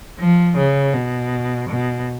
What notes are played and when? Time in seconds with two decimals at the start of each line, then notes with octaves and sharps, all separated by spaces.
0.19 F3
0.58 C#3
0.94 B2
1.69 B2